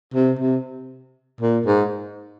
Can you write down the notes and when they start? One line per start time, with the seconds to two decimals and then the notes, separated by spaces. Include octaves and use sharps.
0.14 C3
0.39 C3
1.41 A#2
1.66 G#2